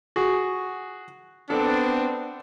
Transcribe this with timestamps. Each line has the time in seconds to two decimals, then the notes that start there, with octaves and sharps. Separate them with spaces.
0.16 F#4 G#4
1.50 B3 C4 D4 A4